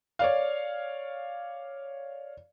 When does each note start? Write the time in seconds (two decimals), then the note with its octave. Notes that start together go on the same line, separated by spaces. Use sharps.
0.19 C#5 D5 F5